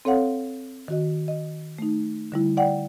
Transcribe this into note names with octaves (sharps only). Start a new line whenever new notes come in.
C4 A4 C#5 F5 F#5
D#3 F#4 D#5
D#5
A3 D#4
D3 G3 E4
D5 F#5 G5